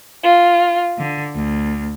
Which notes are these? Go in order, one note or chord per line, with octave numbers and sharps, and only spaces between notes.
F4
D3
D2